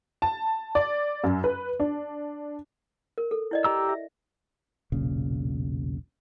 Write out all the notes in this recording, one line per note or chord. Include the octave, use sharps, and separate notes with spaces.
A5
D5
F#2
B4
D4
A#4
A4
E4 D5 D#5
G4 A#5 E6
E5
E1 B1 A#2 C#3